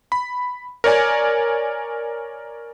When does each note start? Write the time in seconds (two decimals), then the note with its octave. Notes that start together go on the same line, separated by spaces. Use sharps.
0.12 B5
0.84 A#4 C#5 D5 G#5